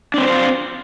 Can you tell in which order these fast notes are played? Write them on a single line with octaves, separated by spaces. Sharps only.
D4 C4 B4 C5 F4